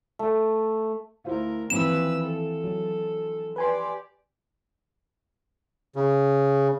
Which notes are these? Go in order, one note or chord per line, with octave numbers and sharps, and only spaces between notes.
A3
D2 E4 A#4 C5 F5
D#2 E3 F3 C4 B4 E6 E7
A4
F#3
G4 B4 D5 G#5 C6
C#3